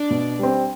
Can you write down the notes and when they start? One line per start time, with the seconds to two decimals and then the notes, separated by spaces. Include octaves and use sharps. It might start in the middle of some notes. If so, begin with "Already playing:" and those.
Already playing: D4 D5
0.10 B2
0.39 G3 C4